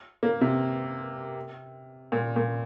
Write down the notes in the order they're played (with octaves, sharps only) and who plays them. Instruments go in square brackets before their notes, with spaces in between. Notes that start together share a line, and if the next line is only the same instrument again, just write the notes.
[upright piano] A#3
C3
A#2
A#2